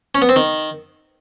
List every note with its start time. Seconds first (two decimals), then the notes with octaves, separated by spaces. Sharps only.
0.15 C#4
0.22 B3
0.29 C4
0.36 D#3